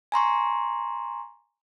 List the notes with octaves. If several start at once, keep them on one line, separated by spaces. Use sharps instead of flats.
G#5 A#5 C6 C#6